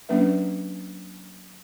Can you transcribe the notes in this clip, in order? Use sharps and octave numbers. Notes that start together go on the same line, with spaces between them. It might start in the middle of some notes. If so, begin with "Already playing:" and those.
F#3 A#3 C#4 D4 B4 E5